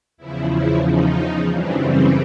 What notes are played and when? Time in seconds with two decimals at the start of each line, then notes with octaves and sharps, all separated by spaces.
0.17 E2 C#3 F3 E4
0.51 E4
0.84 D#4
1.50 F#2 C#3 E3 G3 C4 D4
1.84 C#4